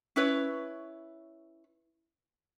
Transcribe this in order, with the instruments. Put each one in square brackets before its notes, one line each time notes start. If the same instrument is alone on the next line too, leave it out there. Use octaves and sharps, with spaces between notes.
[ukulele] C#4 E4 B4 C#5